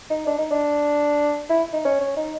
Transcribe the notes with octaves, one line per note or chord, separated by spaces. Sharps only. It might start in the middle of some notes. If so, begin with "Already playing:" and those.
D#4
D4
D#4
D4
E4
D#4
C#4
C#4
D#4